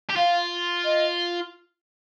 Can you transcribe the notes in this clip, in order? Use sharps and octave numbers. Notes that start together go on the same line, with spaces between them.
G4
F4 F5
D#5